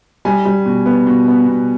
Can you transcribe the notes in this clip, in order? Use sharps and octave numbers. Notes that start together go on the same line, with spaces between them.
G3 G#5
G3
B2
B3
B2
B3
B2